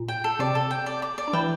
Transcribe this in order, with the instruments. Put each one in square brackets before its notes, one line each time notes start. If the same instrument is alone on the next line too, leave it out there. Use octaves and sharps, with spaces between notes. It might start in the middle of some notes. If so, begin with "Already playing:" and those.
Already playing: [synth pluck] A#2
[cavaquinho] G5
A4
[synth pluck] C3 C4 [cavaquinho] D5
[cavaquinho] A4
G5
D5
D6
D5
[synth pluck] D4
[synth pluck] E3 E4 [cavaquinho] G5